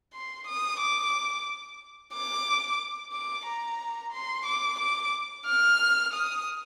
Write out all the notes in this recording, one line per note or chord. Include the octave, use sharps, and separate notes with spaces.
C6
D#6
D6
D6
D6
A#5
C6
D6
D6
F6
D#6